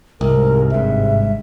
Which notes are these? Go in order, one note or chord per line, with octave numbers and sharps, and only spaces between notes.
C2 G#2 C3 G#3 A#4
G#1 G2 E5